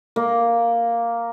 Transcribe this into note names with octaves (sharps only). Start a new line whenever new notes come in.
A#3